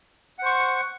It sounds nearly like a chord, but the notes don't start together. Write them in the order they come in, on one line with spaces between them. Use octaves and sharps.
F#5 C5 C#6